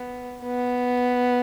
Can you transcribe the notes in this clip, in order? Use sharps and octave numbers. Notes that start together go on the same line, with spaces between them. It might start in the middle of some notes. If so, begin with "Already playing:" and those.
Already playing: B3
B3